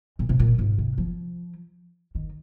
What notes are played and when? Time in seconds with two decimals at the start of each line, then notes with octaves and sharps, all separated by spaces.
0.19 A#2
0.29 C3
0.39 A#2
0.58 G#2
0.78 C3
0.98 F3
2.15 D#3